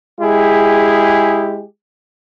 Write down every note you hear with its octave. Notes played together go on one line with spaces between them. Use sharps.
G#3 E4 G4 G#4